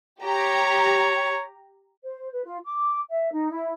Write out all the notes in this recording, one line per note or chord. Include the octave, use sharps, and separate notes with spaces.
G4 C#5 A#5
C5
B4
F4
D6
E5
D#4
E4